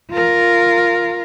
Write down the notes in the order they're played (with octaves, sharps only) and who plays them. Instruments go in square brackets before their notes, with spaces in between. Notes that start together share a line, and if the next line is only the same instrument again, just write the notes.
[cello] F4 A#4